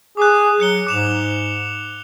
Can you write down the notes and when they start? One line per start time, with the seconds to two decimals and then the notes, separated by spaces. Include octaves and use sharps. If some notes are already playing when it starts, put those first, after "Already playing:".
0.17 G#4 D6 F#6
0.60 F#3 F#6 C#7 G7
0.87 G#2 D6 E7 F7